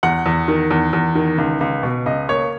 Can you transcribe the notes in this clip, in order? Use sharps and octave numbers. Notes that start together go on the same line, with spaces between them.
E2 F#5
E2
D#3
E2
E2
D#3
C#2
C#2
B2
C#2 D#5
A#3 C#5